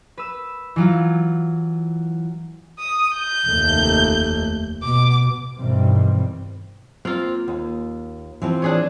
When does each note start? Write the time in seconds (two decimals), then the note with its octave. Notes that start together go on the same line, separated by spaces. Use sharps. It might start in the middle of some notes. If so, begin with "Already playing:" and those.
0.18 B4 E6
0.76 E3 F#3 F4
2.79 D#6
3.17 G6
3.47 F1 D#2 A3
4.83 B2 D6
5.57 G2 B2 D#3 E3 G3 C4
7.05 A#3 C4 F4
7.48 D#2
8.42 E3 F3 C4
8.62 D4 G#4 C#5